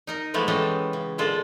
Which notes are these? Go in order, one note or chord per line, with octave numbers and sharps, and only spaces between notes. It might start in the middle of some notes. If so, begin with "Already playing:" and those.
D#4 A#4 D#5
E3 F3 G#3 A3 B3 E4
E3 G#3 C#4 G4 A4 D#5
C#3
A#2 D3 G#3 F4 A4